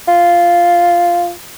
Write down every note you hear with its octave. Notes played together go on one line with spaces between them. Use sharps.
F4